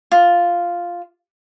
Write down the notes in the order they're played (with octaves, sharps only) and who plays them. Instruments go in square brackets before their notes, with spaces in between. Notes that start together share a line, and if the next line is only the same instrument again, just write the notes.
[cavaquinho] F4